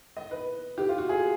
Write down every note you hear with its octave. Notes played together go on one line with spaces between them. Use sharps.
D#5
B4
G4
F4
F#4
G#4